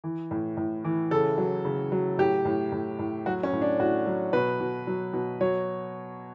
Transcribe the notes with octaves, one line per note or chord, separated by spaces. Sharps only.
E3
A2
A2
E3
C#3 A4
F#3
C#3
F#3
A2 G4
A2
A2
A2
F#3 F#4
C#4
A2
D4
A2 F#4
F#3
B2 B4
B2
F#3
B2
F#3 C#5